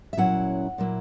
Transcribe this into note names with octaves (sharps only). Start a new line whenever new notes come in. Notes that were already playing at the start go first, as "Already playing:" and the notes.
E5
A#2 F#3 C#4 E4 F#5
A#2 F#3 A#3 E4